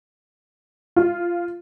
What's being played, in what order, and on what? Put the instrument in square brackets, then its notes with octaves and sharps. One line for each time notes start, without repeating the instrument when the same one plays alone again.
[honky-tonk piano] F4